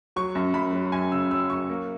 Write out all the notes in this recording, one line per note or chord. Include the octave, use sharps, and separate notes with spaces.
F#3 C#6
F#2
F#2 B5
F#3
F#2 G#5
C#3 E6
F#3 E6
F#2 C#6
A#3